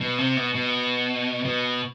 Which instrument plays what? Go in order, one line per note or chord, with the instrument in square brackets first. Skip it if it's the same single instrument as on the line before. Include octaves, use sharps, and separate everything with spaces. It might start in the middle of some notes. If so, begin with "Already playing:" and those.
[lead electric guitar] B2
C3
B2
B2
B2